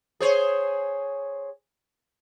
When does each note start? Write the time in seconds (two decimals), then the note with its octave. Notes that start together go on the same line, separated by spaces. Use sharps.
0.20 G#4 C5 C#5